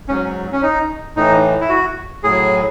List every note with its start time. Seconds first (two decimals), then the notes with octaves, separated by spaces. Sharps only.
0.09 G#2 F#3 C#4
0.52 C#4
0.63 D#4
1.16 A2 E3 D#4
1.61 E4
1.69 F#4
2.24 A2 F#3 G#4